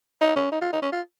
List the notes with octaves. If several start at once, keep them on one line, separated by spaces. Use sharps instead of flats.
D#4
C#4
D#4
F4
D#4
C#4
F4